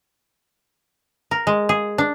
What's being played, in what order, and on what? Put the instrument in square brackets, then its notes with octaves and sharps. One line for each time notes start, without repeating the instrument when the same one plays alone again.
[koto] A#4
G#3
G#4
D4